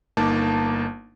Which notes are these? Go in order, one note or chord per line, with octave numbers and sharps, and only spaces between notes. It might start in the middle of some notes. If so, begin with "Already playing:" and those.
G1 A#3 D#4 A5 D6